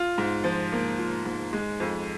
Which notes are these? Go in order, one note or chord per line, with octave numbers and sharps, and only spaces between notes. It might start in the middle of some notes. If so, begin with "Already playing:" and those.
Already playing: F4
G#2
F3
A#3
F4
G#2
G#3
F2